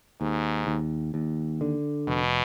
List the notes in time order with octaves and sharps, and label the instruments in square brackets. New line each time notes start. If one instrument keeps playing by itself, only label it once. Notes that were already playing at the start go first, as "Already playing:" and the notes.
[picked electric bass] D#2 [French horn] G#2
[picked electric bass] D#2
D#2
D3
[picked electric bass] F1 [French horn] B2